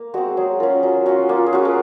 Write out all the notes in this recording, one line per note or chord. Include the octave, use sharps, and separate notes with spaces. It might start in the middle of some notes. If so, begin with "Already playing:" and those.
Already playing: A#3 A#4
G#3 C4 F#4
F#3 G#4
C#4 F4 A#4
F#3
C#4 F4 F#4
A#3 F4
G#4
C#4 F4 F#4
A#4